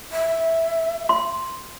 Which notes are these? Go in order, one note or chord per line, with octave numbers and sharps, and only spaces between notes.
E5
C6